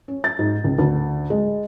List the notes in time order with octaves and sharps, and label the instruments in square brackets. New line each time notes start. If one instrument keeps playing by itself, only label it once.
[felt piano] C#4
A6
G#2
C#2
D2
G#3